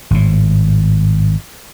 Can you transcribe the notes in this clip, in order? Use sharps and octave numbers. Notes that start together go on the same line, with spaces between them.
G#1 A2